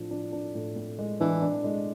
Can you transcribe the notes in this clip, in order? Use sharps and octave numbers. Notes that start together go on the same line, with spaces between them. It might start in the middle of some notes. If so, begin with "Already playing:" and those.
Already playing: A2 F3 D4
D4
D4
A2
A2
G#3
E3 D4
D4
G#3